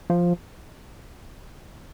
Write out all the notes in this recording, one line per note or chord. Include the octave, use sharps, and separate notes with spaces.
F3